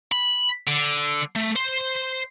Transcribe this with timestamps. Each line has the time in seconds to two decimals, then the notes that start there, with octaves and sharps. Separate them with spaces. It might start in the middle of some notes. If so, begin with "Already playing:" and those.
0.12 B5
0.67 D3
1.35 A3
1.56 C5